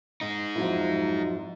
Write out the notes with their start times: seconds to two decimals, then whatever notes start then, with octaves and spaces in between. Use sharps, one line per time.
0.21 G#3 D#4
0.56 F2 F#3 E4